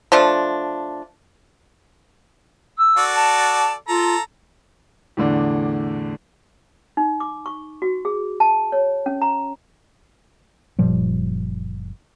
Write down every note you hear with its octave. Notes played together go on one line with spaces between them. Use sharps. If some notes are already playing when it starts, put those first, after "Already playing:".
F3 A3 D4
E6
F#4 A4 D5
A5
F4 A4 A#5
E2 A2 D3 D4
D#4
D6
C#6
F#4
G#4
A5
C#5
C#4
A#5
F#1 A#2 F3 G3